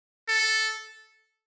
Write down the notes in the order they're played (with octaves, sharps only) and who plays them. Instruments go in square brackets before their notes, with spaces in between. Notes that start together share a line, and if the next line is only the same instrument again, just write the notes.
[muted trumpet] A4